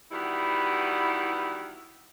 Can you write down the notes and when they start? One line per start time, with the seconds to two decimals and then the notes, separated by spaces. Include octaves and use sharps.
0.12 D#3 E3 G3 B3 E4 F#4